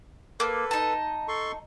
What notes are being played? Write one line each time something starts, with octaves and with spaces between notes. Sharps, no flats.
A#3 A4 B4
D#4 A5
A4 C6 C#6